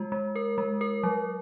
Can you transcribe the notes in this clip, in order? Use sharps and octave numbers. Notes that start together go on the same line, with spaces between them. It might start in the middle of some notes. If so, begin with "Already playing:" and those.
Already playing: G#3 F4
G#3
A#4
G#3
A#4
F#3